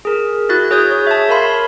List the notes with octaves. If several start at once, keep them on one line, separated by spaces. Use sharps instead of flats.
G#4 A#4
E4 F#4 F#6 A6
G#4 C#5 D#6 G6
C#5
E5 A5
A#4 C#5 F5 A5 B5 C6